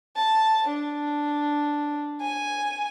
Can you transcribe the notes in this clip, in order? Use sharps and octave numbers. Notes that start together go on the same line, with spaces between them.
A5
D4
G#5